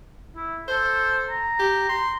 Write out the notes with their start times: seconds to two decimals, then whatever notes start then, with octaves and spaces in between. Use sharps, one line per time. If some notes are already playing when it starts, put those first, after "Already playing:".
0.36 E4
0.68 A4 C5
1.29 A#5
1.59 G4
1.89 C6